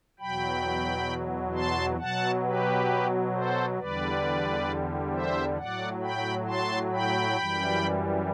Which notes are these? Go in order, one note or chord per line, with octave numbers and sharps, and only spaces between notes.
E2 B2 F#3 G5 B5
A5 C6
B2 F#3 F#5 A5
G4 B4
A4 C5
E2 D3 G3 B4 D5
C5 E5
A2 F#3 D5 F#5
G5 B5
A5 C6
G5 B5
F#2 E3 G3